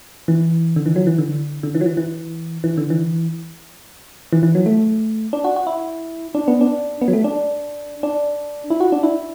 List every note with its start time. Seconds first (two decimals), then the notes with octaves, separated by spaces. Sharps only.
0.28 E3
0.76 D3
0.86 E3
0.96 F#3
1.07 E3
1.18 D3
1.63 D3
1.75 E3
1.81 F#3
1.86 E3
1.97 E3
2.64 E3
2.78 D3
2.90 E3
4.33 E3
4.43 E3
4.55 F#3
4.66 A3
5.33 D4
5.44 F#4
5.56 F#4
5.67 E4
6.35 D4
6.48 B3
6.61 D4
7.01 B3
7.08 F#3
7.13 A3
7.24 D4
8.03 D4
8.70 E4
8.80 F#4
8.92 D4
9.03 E4